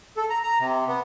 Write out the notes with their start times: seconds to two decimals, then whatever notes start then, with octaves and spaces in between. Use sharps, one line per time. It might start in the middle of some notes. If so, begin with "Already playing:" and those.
0.17 A4
0.30 A#5
0.43 A#5
0.60 C3
0.88 B3